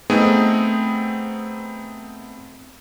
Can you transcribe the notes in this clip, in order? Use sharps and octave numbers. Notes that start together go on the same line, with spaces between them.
A3 B3 C4 D#4 G#4